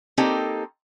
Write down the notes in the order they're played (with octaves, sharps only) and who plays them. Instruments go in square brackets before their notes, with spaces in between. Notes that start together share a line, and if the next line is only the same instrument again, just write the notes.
[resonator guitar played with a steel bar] A#3 C4 D#4 G4 A4